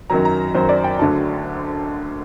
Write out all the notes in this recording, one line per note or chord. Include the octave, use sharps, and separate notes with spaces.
F#2 D#3 F#3 A#5
A#5
F#2 D#3 F#3 C5
D5
G5
D2 D3 F#3 A5